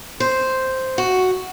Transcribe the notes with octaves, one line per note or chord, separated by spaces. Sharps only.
C5
F#4